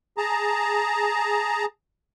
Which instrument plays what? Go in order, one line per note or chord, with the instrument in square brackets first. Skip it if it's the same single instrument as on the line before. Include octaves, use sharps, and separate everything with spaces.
[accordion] G#4 A5 A#5